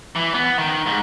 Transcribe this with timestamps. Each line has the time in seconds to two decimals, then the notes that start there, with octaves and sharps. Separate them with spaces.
0.16 E3
0.34 B3
0.58 D#3
0.87 G#2